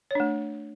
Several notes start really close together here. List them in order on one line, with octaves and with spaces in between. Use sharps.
C#5 D4 A3